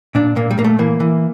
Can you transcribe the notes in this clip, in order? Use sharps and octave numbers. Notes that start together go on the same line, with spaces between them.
A#2 D4
A#2 A#3
G3
A#2 A#3
A3
E3 A#3
E3